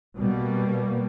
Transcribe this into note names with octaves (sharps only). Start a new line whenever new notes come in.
B2 G3 A#3